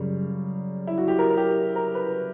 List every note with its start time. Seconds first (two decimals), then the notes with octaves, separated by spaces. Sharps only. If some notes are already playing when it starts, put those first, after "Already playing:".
Already playing: F#2 C#3 G3
0.87 E4
0.98 F#4
1.08 G4
1.19 A#4
1.30 A#4
1.37 G4
1.76 A#4
1.95 B4